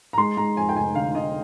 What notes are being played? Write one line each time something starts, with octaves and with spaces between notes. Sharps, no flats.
A#5
G#3 C6
G#3 A#5
F2 G#5
G5
F1 G#5
D3 F5
D3 D#5